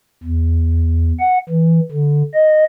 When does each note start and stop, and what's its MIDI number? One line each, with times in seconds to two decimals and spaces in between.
0.23 1.12 40
1.19 1.38 78
1.49 1.80 52
1.92 2.23 50
2.34 2.64 75